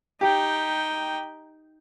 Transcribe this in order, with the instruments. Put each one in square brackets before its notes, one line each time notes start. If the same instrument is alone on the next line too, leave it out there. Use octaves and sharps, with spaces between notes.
[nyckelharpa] D#4 G5 [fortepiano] G4